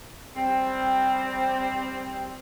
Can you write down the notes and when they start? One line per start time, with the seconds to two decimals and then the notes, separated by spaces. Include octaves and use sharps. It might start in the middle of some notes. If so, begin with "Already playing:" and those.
0.36 G3 C4